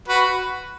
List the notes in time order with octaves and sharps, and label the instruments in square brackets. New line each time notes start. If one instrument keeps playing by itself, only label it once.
[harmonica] F#4 B4